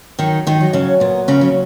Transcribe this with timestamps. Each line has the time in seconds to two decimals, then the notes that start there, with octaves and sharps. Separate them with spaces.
0.19 D#3 F#3 D#4
0.47 D#3 D#4
0.61 F#3
0.73 C#3 C#4
1.00 A#2 B3
1.28 C#3 C#4
1.41 F#3